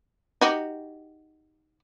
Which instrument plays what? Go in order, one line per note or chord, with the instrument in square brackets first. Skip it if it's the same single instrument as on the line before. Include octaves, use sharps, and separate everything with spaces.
[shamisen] D#4 F#4 G4